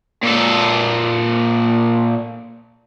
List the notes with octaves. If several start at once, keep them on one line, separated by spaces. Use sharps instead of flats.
A#2 A4